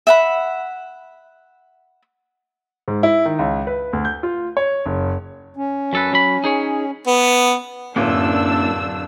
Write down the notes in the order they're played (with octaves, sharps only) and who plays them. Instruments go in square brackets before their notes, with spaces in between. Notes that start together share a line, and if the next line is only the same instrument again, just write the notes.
[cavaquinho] E5 F#5 B5
[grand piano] G#2
E4
D#3
C#2
B4
D2
G6
F4
C#5
F#1
[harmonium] C#4
[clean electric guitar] F#2 A4 B4
F#3 B5
D#4 G#4 C#5
[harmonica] B3
[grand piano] D1 [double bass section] F#2 [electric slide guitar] A#3 C#4 E4 [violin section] D4 E6